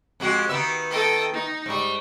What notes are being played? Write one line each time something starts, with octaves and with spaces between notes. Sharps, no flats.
F2 G#3 F#4 G4
D#3 B3 E5
A4 D#5 G5
D#4
G#2 G3 C#6